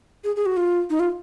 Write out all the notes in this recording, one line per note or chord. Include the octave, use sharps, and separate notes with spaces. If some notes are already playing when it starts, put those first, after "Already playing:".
G#4
G#4
F#4
F4
D#4
F4